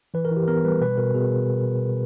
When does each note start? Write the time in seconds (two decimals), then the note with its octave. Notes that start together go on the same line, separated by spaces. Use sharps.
0.14 E3 B4
0.25 A#4
0.31 E3
0.36 G4
0.48 B3 A#4
0.64 G3 B4
0.81 B2 B4
0.98 B2 A#4
1.14 B2 G#4